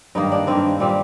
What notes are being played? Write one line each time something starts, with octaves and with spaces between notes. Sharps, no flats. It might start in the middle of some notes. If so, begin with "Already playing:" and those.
G2 D#3 A#3 D#4
D4
G2 D#3 A#3 C4
A#2 G3 A#3 C4